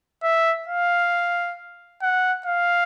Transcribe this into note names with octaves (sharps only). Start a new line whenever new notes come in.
E5
F5
F#5
F5